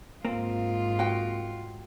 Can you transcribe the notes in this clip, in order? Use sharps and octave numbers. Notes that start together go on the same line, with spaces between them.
G#2 A#3 C4 F4
F#4 G5